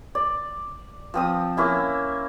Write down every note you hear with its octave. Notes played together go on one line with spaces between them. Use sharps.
D5
F3 C4 D#6
A#3 C#4 E4 E5